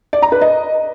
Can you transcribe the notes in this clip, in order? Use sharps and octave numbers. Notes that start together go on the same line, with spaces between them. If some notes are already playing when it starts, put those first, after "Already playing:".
D5
A#5
B4
D#5